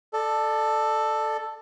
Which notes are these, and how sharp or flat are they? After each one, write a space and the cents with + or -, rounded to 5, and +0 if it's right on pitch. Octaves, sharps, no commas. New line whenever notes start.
A4 +0 D5 +30